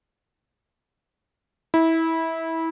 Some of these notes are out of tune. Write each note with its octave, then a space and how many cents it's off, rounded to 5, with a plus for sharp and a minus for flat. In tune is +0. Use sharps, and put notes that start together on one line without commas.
E4 -20